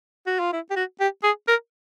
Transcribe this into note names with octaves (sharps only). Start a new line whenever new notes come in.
F#4
F4
E4
G4
F#4
G4
G#4
A#4